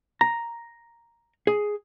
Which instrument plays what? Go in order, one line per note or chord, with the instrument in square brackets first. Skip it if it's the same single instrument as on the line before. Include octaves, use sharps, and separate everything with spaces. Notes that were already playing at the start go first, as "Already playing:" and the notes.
[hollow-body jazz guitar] A#5
G#4